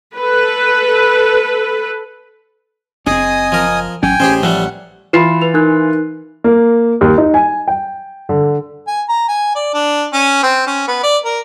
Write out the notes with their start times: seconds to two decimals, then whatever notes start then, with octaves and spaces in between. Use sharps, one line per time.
0.17 A4 B4
3.07 F#1 C4 C#4 G#4 D#5 G#5 D#6
3.52 F3 A#4
4.03 A1 F#3 C#4 G5 G#5
4.20 A1 C#4 G4 G#4 C5
4.43 F3 G3 A3 F#5
5.13 E3 F4 B5 C7 E7
5.41 B4 F7
5.54 D#4 A#4 F#6
6.44 A#3
7.01 D#2
7.18 D#4
7.34 G#5
7.68 G5
8.29 D3
8.88 G#5
9.09 A#5
9.28 G#5
9.55 D5
9.74 D4
10.13 C#4
10.43 C4
10.67 C#4
10.88 B3
11.03 D5
11.25 A#4